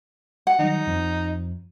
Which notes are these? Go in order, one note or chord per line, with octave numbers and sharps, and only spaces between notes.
F#5
D#3 F#3 G3 D#4
F2 F3